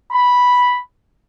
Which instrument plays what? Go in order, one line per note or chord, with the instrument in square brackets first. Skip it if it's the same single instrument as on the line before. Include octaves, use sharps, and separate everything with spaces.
[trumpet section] B5